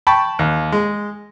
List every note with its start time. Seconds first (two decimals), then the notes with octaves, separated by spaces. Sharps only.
0.07 G5 A5 B5 C#6
0.39 D#2
0.72 G#3